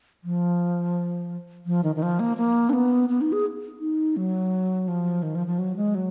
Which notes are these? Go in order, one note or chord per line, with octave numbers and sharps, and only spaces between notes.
F3
F3
D#3
D#3
F3
A#3
A#3
D4
B3
B3
D#4
G#4
D#4
F#3
F3
D#3
F3
F3
F#3
G#3
F#3